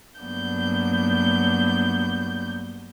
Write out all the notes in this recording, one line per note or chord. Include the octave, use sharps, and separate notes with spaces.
G2 F#3 A#3 B3 D4 G6